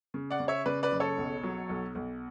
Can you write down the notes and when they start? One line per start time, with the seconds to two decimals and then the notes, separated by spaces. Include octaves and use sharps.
0.14 C#3
0.31 D5 F#5
0.40 C#3
0.48 C#5 E5
0.66 C#3 B4 D5
0.83 B4 D5
0.91 F#1
1.00 A4 C#5
1.17 B1
1.44 F#3
1.69 B1
1.95 B1